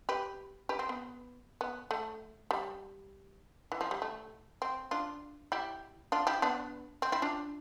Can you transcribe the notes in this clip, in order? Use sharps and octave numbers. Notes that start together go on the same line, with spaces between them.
G4 B4
G4 B4
C4
B3
B3
A3
G3
E3
F3
G3
A3
C4
D4 F4
E4 G4
D4 F4
E4 G4
B3 D4
C4
C4 E4
D4 F4